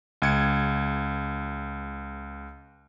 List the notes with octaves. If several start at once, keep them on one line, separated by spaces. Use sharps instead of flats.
C#2 G#6 C#7